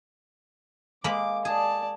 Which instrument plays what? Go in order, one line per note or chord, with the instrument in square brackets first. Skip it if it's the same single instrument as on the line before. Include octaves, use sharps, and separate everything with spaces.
[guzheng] G#3 A#3 B5 [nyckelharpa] D6
[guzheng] G#4 [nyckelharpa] D5 A5